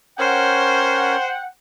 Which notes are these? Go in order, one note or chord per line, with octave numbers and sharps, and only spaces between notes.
C#4 A#4 C5 C#5 F#5 G5